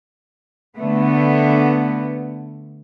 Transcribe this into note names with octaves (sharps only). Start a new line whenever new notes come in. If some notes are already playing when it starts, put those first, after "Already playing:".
D3 A3 B3